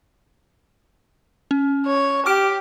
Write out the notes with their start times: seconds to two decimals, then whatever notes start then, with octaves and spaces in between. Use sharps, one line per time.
1.51 C#4
1.87 C#5
2.26 G4 D6 F6 D7